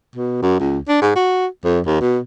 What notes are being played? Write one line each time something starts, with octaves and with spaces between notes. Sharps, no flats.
B2
F#2
C#2
D4
G#2
F#4
F2
D#2
B2